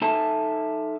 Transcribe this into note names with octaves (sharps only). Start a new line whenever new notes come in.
D#4 A4 E5 G#5 A5